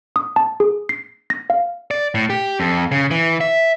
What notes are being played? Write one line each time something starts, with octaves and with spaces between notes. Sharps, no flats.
D#6
A5
G#4
C7
A#6
F5
D5
A2
G4
F2
C#3
E3
E5